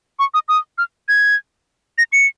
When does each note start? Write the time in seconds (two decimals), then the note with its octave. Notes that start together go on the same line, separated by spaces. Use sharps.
0.19 C#6
0.34 D#6
0.48 D#6
0.78 F6
1.08 G#6
1.98 A#6
2.12 C#7